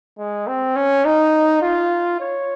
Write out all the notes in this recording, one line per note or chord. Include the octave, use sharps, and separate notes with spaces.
G#3
C4
C#4
D#4
F4
C#5